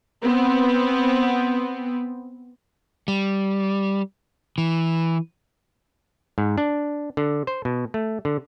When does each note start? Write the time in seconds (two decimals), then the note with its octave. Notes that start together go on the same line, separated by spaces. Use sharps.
0.22 B3 C4
3.08 G3
4.58 E3
6.38 G#2
6.58 D4
7.17 D3
7.47 C5
7.65 B2
7.94 A3
8.25 D3